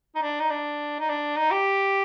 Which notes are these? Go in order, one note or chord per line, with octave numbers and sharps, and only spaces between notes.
D#4
D4
D#4
D4
D#4
D4
D#4
G4